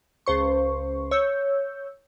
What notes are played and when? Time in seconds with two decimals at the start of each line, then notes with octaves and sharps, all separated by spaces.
0.26 C#2 C5 C#6
1.11 C#5 E6 G6